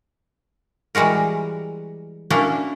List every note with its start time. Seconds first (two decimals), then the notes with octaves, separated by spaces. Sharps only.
0.95 E3 G3 G#3 F#4 A#4
2.30 A#3 C#4 D4 E4 F#4